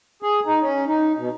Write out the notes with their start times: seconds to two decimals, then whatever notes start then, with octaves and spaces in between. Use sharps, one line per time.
0.23 G#4
0.46 D#4
0.61 C#4
0.87 D#4
1.17 B2